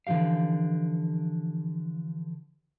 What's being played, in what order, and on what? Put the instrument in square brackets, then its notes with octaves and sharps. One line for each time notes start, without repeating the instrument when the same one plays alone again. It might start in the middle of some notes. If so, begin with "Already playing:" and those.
[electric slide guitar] D3 E3 F3 G4 F5